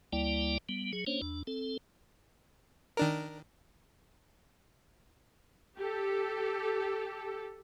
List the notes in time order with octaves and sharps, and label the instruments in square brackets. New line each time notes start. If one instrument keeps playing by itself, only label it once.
[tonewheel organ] D2 G3 A#3 E4 D5 G5
G3 B3
F#3 G#4
A#3 C#4 D4 C5 C#5
E2 D4
C4 A4
[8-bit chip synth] D#3 D4 A#4
[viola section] G4 A4